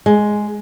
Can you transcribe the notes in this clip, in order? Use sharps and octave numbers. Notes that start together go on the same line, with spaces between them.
G#3